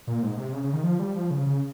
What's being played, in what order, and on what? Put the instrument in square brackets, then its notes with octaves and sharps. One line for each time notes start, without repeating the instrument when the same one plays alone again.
[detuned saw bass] A#2
G#2
C3
C#3
C#3
D#3
F3
G3
F3
C#3
C#3